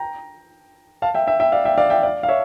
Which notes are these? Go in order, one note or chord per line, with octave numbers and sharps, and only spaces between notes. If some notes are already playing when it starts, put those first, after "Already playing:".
Already playing: G5 A#5
F5 A5
E5 G5
E5 G5
E5 G5
D5 F5
E5 G5
D5 F5
E5 G5
D5 F5
F5
C#5 E5